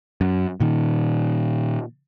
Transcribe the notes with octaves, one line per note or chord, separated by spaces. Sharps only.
F#2
A#2 D#3